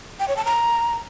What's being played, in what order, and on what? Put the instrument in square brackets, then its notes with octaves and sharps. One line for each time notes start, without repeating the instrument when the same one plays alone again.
[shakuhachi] G5
C#5
A5
A#5